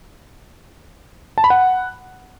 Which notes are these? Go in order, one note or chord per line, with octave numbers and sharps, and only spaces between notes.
A5
B5
F#5